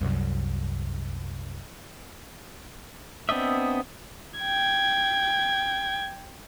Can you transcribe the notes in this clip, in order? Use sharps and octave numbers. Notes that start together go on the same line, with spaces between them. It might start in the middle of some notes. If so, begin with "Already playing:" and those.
C2 F#2
B3 C4 D4 D#5 E5
G5 G#6